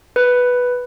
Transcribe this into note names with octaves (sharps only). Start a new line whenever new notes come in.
B4